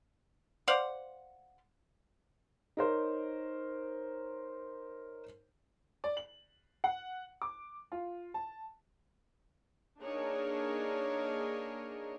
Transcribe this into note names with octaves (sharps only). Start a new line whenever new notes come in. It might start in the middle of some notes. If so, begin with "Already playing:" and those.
C5 D5 F5 F#5
D#4 A#4 C5 C#5
D5
F#7
F#5
D6
F4
A5
A#3 D4 D#4 G#4 A#4 C#5